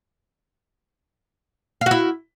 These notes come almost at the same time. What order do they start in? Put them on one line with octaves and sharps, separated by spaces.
F5 F#4 E4